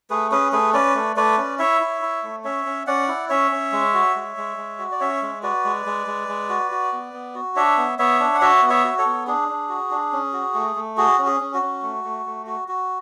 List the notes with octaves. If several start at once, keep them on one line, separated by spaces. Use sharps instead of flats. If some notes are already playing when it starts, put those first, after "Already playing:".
A3 G#4 B4
C#4 G#4 B4
A3 G#4 B4
C#4 B4 D5
A3
A3 B4 D5
C#4
E4 C#5 E5
E4
E4
A3
C#4 C#5 E5
C#4
C#4 D5 F#5
E4
C#4 C#5 E5
C#4
G#3
F#4
G#3
G#3
G#3
F#4
D5
C#4 C#5 E5
G#3
F#4 B4 D5
G#3
G#3
G#3
G#3
F#4
F#4
B3
B3
F#4
D4 C#5 E5
B3
B3 C#5 E5
D4
F#5
F#4 C#5 E5
B3
C#5 E5
F#4
A4 C#5
B3
D4 G#4
D4
F#4
D4
C#4
F#4
A3
A3
F#4 G#4
C#4
G#4
C#4
F#4
C#4
A3
A3
A3
F#4
F#4